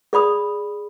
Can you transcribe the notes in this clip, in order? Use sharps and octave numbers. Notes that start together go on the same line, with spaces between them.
G#4 D5 B5 D#6